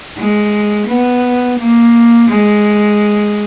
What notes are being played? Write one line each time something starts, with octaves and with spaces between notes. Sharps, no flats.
G#3
B3
A#3
G#3